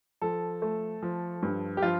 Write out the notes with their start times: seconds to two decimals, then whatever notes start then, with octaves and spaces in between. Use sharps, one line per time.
0.22 F3 A4
0.62 A3
1.03 F3
1.43 G2
1.77 G4
1.82 F3 F4